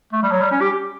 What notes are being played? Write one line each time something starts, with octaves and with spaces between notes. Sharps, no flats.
A3
G3
F#3
G3
C#4
G4